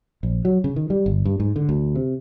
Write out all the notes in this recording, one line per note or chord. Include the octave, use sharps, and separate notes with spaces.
A#1
F#3
C#3
D#3
G3
G1
G2
G#2
D3
D2
C3